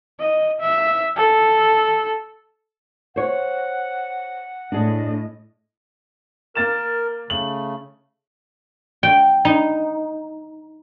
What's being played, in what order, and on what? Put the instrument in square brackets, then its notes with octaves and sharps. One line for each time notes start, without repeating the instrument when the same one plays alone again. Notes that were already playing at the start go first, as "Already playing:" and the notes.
[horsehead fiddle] D#5
E5
A4
[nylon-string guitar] C5 C#5 [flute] F#5
[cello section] A2 D#5 [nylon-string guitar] D4 G#4
[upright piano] A#3 A6 E7 [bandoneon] A#4
[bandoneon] C#3 A3 [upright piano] F#7
[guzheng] G5
D#4